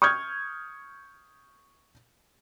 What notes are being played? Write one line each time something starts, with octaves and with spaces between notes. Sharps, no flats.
C#6 D#6 F6 G6 G#6